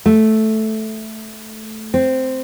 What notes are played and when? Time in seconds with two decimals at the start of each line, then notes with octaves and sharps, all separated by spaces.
0.06 A3
1.94 C4